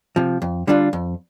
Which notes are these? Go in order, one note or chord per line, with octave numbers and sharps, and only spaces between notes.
C3 F3
F2
D3 G3 D4 F4
F2